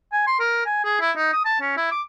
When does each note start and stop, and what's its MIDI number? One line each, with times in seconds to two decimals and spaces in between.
0.12 0.23 80
0.27 0.40 84
0.40 0.62 70
0.66 0.84 80
0.84 0.97 68
1.01 1.11 64
1.16 1.30 63
1.33 1.41 87
1.45 1.57 81
1.61 1.73 61
1.77 1.88 64
1.91 2.02 86